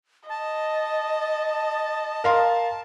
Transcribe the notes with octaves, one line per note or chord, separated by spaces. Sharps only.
D#5 A5
A#4 F5 C6